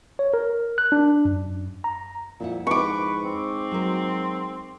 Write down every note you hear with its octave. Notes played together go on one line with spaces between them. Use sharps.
C#5
A#4
F#6
D4
F#2
A#5
F2 A#2 E4 F#5
G#2 B4 C#6 D6
C4
F#3 A#4